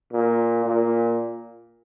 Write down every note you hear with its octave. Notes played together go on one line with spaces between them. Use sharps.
A#2
A#2